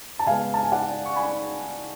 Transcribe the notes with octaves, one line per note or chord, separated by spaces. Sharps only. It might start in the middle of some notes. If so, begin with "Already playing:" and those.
A5
C#3 G#3 B3 F5 G#5
A5
G#5
D5 F#5
C#6
G#5 B5